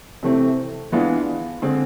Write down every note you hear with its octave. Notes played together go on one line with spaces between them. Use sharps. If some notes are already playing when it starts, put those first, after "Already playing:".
C3 E3 A3 C4
E3 G#3 B3 D4 F4
D3 G#3 C4